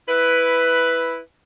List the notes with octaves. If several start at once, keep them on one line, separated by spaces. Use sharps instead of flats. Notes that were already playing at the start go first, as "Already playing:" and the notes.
E4 B4